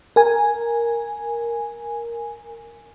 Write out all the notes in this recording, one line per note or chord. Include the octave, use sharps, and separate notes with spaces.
A#4 G#5